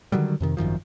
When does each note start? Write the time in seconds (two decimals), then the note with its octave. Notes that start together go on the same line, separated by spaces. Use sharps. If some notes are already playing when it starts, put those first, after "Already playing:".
0.12 D3 D#3 F#3 G3
0.40 F2 C3 D#3
0.57 G#1 F#2 D#3 F3